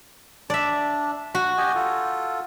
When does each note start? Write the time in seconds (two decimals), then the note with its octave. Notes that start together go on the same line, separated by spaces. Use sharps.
0.50 D4 D5 E5
1.35 F#4 F#5
1.58 G4 D#5 G#5
1.75 F4 A4